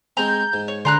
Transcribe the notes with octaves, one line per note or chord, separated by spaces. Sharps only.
G#3 C4 A#5 G6
G#2
C#5
D3 C5 A#5 F#6